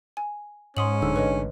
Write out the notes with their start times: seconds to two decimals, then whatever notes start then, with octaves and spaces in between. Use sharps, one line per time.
0.17 G#5
0.77 G#2 C#4 C6 D#6 F#7
1.02 D1 G#2 D3 E6
1.16 A1 B4 C#5 D#5